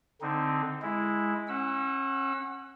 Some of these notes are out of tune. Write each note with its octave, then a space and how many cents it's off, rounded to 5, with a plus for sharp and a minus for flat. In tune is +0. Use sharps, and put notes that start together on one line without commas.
D3 +0 C4 +0 D#4 +0
G#3 +0 E4 +0
C#4 -35 F#5 +0 E6 +0